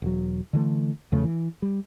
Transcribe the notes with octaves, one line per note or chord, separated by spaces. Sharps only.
E1 F#3
D3 E3 A3
E2 C#3 F3 A3
E3
G3